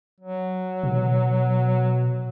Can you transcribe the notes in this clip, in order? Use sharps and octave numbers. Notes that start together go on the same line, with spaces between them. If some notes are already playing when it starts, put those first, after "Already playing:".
F#3
B2